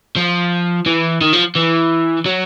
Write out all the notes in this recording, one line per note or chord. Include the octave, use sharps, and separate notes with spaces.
F3
E3
D#3
F3
E3
F#3